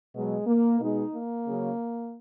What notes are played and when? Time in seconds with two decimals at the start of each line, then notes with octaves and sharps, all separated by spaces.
0.15 B2 F#3 G#3
0.47 A#3
0.80 B2 G#3 D#4
1.14 A#3
1.47 C#3 F#3